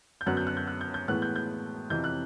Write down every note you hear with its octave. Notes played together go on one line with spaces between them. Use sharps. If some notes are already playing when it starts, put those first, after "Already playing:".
G6
F#2 D3 F#3 B3 F#6
G6
F#6
G6
F#6
G6
G6
A2 E3 G#3 B3 F#6
G6
G6
F2 C3 E3 G6
F#6